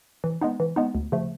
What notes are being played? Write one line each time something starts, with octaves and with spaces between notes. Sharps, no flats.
E3
G#3 B3 D#4
E3
G#3 B3 D#4
D2
C#3 F3 A3